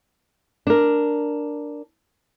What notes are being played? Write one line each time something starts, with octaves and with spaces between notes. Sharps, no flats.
D4 A#4